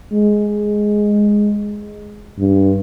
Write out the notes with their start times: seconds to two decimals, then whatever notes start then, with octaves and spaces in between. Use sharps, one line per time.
0.13 G#3
2.38 G2